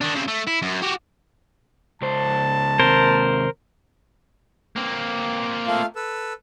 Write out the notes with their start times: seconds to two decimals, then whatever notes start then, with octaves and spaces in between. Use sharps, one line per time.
0.01 D#3 D4
0.15 C#3 C4
0.28 A3
0.47 E4
0.62 F#2
0.82 F#4 G4
2.02 C#2 C5 A5
2.80 D#2 C3 A#4 C5
4.76 A#3 C4
5.67 A3 F4 F5
5.96 A4 B4 E6